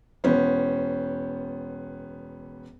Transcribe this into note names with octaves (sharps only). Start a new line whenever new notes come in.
E1 B3 C#4 C5